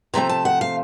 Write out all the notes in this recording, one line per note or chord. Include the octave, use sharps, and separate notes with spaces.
C3 F3 A3 C4 A#5
A5
F#5
F5